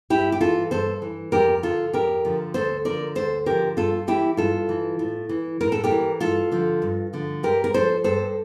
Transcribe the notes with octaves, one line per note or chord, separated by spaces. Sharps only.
G2 E4 G4
G4
E3 F4 A4
G2 A4 C5
E3
F2 G4 A#4
D3 F3 F4 A4
F2 G4 A#4
D3 F3
D2 A4 C5
D3 F3 A#4 D5
D2 A4 C5
D3 F3 G4 A#4
G2 F4 A4
E3 E4 G4
G2 F4 A4
E3
A2
E3
A2 A#4
A4
G4 A#4
E3
G2 F4 A4
D3 F3
G2
D3 F3
G2 G4 A#4
A#4
F3 A4 C5
G2 A4 C5